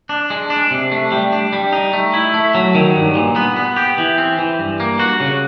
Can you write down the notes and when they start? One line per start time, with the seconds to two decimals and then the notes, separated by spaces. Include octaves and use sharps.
0.09 D4
0.30 G#3
0.50 D4
0.71 C3
0.92 A3
1.12 G3
1.32 D4
1.53 G3
1.73 D#4
1.93 A3
2.14 E4
2.34 A3
2.55 F#3
2.75 D#3
2.95 G2
3.15 A#2
3.36 B3
3.57 B3
3.76 G4
3.98 E3
4.18 C4
4.39 E3
4.59 G2
4.80 A#3
5.00 F#4
5.20 C#3